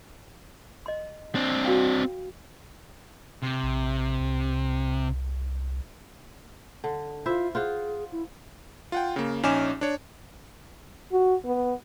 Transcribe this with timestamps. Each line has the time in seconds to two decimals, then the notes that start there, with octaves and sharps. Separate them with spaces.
0.86 D#5 C6
1.35 C4 D4
1.63 F#4 F5 G5
3.42 C3
3.63 A#1
4.20 C2
6.84 D3
7.26 E4 F4 C5 E5
7.55 F4 G#4 C5 F#5
8.12 E4
8.92 F4 F#5 G5
9.16 C#3 A#3
9.43 A#1 C#4 D#4 G#5 D6 E7
9.81 D4 C#5
11.12 F#4
11.45 B3